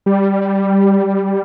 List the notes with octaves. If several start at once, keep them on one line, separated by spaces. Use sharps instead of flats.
G3